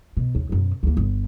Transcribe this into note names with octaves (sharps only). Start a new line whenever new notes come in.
B2
D#2
F#2 B2
D2 A#3
G1